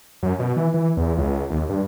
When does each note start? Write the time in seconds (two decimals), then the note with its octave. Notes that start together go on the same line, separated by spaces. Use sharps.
0.23 F#2
0.39 B2
0.56 E3
0.74 E3
0.97 E2
1.18 C#2
1.50 D#2
1.69 G2